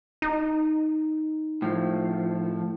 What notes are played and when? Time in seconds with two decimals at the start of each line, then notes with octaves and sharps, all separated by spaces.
0.22 D#4
1.62 A2 F3